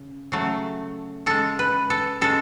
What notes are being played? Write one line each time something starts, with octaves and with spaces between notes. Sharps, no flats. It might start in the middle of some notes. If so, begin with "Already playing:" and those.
Already playing: C#3
C#3 F#3 A3
C#3 G#3 A4
B4
A4
C#3 G#3 A4